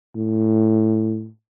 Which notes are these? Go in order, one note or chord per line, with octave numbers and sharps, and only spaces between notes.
A2